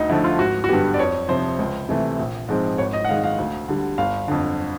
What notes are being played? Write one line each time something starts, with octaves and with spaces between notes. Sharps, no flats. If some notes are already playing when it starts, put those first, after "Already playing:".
Already playing: D2 D#4
D3 F3 A3 E4
F4
G#1 F#4
F#4
G2 D3 G3 B3 G4
D5
F2 C#5
C3 F3 C5
C#2
C3 E3 A3
A#1
G#2 F3 G#3 C4
G#1 C#5
D#5
F#5
G#2 D#3 G#3 F5
F5
D2
D3 G3
G1 F5
F2 D3